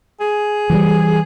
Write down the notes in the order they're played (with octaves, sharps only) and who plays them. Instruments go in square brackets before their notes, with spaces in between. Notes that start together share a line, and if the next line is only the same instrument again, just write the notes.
[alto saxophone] G#4
[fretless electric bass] E3 F3 G3